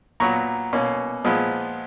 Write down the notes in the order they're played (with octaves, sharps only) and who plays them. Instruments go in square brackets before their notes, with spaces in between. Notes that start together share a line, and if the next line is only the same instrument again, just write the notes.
[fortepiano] A#2 F#3 B3 A#5 C#6
B2 A#3 C#4
A#2 F3 G#3 B3